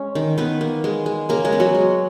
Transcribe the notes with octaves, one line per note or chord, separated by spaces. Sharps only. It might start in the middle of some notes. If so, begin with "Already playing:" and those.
Already playing: G#3 C#4
D#3
D#3 B3 B4
A#3
G#3
G#3
C#3 A#3 A#4
G#3 G#4
B3
F#3 F#4
G#3